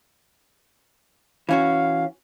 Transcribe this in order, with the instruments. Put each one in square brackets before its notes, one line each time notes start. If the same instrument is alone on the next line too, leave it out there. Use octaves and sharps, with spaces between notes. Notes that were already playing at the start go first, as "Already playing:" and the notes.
[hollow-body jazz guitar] E3 C#4 F#4 [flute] F5